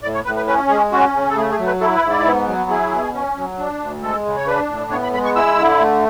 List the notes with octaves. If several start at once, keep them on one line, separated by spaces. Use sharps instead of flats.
A2 D5
C#5
A2 B4
B4
C#4 B4
G#3 G#4
C#4 F#4
C#3
A4
A3 G#4
G#4
F#3
B4
E4 A4
B4
G#2
D5
B3
F#3
E4 G#4
B2
C#4
F#3
D4
D2
G#3 A4
C#3
C#5
D4 B4
A2
B3 C#5
B5
G#3 B5
C#6
E4 E6
D3
A3